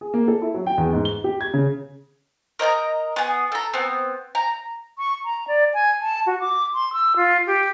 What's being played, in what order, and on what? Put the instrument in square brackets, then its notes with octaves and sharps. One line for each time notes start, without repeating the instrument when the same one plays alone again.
[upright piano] G#4
A#3
A4
E4
F#3
G5
E2
G#2
G7
G4
G#6
C#3
[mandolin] A#4 D#5 G#5 A#5
B3 G#4
A4 A#5
B3 C4
A#5
[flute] C#6
A#5
D5
G#5
A5
F#4
D6
C6
E6
F4
G4